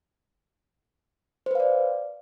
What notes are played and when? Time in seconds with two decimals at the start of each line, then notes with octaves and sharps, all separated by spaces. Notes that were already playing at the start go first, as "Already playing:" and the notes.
1.46 C5
1.51 B4
1.55 F5
1.60 D5